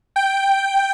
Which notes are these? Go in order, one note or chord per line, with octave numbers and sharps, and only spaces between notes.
G5